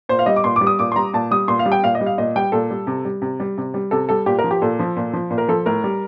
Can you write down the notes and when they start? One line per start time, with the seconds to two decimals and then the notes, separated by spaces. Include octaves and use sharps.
0.09 A#2 C5
0.19 F5
0.26 G3 D#5
0.36 D6
0.44 A#2 C6
0.56 D6
0.61 G3
0.67 D#6
0.79 A#2 D6
0.92 C6
0.96 G3 A#5
1.14 A#2 A5
1.31 G3 D#6
1.48 A#2 C6
1.59 F5
1.66 G3
1.72 G5
1.83 A#2 F5
1.95 D#5
2.01 G3
2.06 F5
2.18 A#2 D#5
2.36 G3 G5
2.52 A#2 A4
2.71 G3
2.87 C3
3.05 G3
3.22 C3
3.40 G3
3.58 C3
3.74 G3
3.91 C3 A4
4.09 G3 A4
4.26 A#2 G4
4.39 A#4
4.44 F3
4.51 G4
4.62 A#2 A4
4.79 F3
4.97 A#2
5.13 F3
5.30 A#2
5.38 A#4
5.48 F3 A4
5.66 A2 A#4
5.84 G3